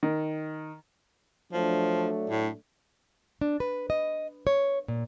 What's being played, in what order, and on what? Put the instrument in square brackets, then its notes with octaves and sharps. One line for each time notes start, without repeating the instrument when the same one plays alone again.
[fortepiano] D#3
[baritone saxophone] F3 [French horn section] F#3 A3 D4
[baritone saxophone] A2
[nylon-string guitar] D4
B4
D#5
C#5
A#2